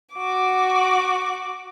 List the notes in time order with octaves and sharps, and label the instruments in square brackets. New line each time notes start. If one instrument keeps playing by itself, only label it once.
[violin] F#4 D6